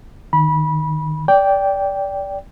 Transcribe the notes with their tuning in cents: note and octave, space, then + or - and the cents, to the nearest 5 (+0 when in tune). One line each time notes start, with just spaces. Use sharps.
D#3 -15 B5 -20
D5 -20 G5 +0